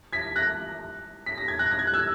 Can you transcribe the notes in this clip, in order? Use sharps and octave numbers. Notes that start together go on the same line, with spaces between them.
G#6 B6
F#6 A#6
B6
A#6
G#6
F#6 A#6
A#6
G#6
F#6
E6 G#6